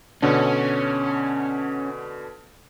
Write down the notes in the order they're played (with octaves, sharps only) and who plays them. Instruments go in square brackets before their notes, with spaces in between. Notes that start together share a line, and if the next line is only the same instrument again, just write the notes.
[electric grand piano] B2 D3 D4 [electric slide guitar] C#4